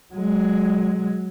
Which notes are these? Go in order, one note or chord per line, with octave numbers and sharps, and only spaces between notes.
F#3 G#3